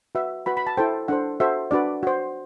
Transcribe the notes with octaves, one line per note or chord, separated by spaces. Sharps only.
F#4 B4 E5
F#4 B4 B5
B5
A5
E4 A4 C5 G5
D4 A4 C5 F#5
F#4 A4 C5 E5
D4 F#4 B4 D5
F#4 C5